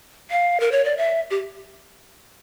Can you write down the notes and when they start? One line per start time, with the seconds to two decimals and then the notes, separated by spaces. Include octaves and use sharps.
0.31 F5
0.60 A#4
0.72 C#5
0.85 D5
0.97 E5
1.30 G4